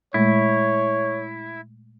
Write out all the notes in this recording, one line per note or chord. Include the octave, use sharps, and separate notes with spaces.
A#2 G#3 A3 E4 C#5